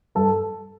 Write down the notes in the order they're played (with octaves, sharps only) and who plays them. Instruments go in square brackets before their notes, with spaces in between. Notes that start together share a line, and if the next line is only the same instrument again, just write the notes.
[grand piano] G2 A4